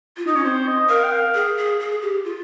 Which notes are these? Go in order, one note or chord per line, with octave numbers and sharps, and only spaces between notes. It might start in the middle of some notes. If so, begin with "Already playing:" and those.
F4
D#4 D#5
C#4 C#5
C4 C5
D#5
A#4 F5
G5
F5
G#4
G#4
G#4
G4
F4